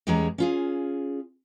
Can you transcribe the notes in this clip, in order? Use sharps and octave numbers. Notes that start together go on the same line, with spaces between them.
E2 G3 G#3 C#4 G#4 A#5
C#4 F4 G#4